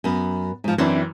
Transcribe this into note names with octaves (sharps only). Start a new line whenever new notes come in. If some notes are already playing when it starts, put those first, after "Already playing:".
F#2 B3
G#2 F3
F#2 E3 C4 D4 E4